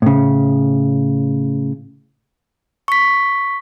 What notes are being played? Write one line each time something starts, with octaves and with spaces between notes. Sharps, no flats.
A2 C#3
C#6 B6